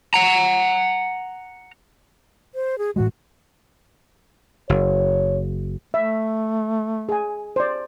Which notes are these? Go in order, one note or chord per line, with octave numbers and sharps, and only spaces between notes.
F#5 A#5
C5
G#4
A2 E3 G#3 F#4
F#1 C#5
A3 E5
G#4 G#5
C5 D5